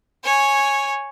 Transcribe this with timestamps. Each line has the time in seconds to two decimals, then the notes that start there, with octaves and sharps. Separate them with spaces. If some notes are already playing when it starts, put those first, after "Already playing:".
0.24 C#5 G#5